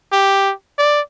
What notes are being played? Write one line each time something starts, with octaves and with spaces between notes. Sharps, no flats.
G4
D5